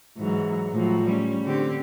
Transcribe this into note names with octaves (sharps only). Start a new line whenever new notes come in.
G#2 E3 F#3
A2 F3 F#3
G3 C#4
D3 C4 G4